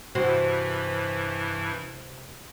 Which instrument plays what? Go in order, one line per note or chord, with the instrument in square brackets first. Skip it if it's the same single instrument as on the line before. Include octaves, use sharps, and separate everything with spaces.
[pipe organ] G2 E3 E4 [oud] C3 F#4 C5